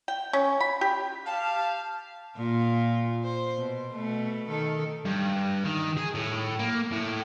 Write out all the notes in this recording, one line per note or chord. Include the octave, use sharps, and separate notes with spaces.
G5
C#4
B5
G4
G4 F5 A5
A#2 F4
C5
B2
B2 A3
D#3 A4
G2
D#3
G#4
A2
A#3
A2